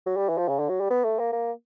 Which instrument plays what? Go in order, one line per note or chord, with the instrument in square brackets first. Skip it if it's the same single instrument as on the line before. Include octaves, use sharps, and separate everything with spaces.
[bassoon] F#3
G3
E3
F3
C#3
D3
F#3
G3
B3
A3
A#3
A#3